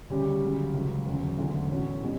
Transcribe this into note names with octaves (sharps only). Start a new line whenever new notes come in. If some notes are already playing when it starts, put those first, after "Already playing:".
D2 C#3 G3 C#4 G4
D2 C#3 F#3
C#2 C#3 F#3
E1 D2 C#3 F#3
E1 D2 D3 F#3
A2 F#3 A3 C#4
B2 G3 C#4